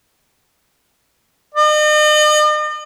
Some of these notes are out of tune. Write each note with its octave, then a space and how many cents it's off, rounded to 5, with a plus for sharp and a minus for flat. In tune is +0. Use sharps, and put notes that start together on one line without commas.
D#5 -45